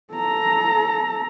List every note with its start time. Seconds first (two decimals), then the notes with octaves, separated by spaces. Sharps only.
0.14 A4 A#5